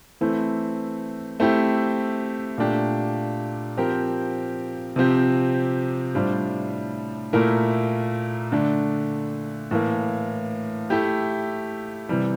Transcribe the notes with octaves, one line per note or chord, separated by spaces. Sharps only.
E3 A3 C4 E4
A3 C4 E4 G4
A#2 A3 D4 G4
F3 C4 G4 A#4
C3 F3 C4 G4
A2 G3 D4 F4 C5
A#2 A3 E4 A#4
D3 A3 D4
A2 E3 A#3
A3 E4 G4
C3 E3 G3